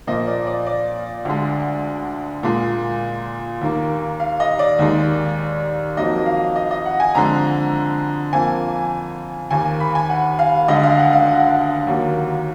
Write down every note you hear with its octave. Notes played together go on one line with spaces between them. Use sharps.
A#2 F3 A#3 D#5
D5
D5
D5
D2 D3 G#3
A#2 G#3
D#2 D#3 A#3
F5
D#5
D5
D#2 D#3 G#3
F2 D#3 F#3 A#3 D#5
F5
D#5
D#5
F#5
G#5
F2 D3 G#3 A#5
F2 F3 A#3 G#5
D#2 D#3 A#3 G#5
B5
G#5
F#5
F5
D2 D3 G#3 D#5
F5
F#5
F5
F#5
D#2 D#3 F#3 A#3